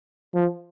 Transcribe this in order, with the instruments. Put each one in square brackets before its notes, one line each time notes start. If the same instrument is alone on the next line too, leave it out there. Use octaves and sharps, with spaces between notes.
[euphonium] F3